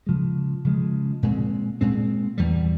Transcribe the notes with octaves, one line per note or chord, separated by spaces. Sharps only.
C#3 F3 G#3
C#3 F3 G#3
A#2 G#3 C4
A#2 G#3 C4
E2 E3 G3